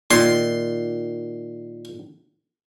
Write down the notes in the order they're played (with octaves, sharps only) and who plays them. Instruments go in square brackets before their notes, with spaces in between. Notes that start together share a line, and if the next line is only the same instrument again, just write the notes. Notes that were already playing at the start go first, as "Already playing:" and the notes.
[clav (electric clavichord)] A#2 D#3 [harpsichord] C6